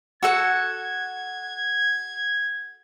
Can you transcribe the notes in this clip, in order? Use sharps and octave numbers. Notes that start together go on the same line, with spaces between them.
F#4 A4 F#5 G#6